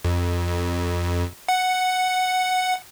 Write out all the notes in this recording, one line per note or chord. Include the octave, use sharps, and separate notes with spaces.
F2
F#5